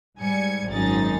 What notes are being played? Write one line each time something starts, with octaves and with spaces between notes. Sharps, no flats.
G#2 G3 G#5 G#6 C#7
G#1 F#2 D#4 G#4 A6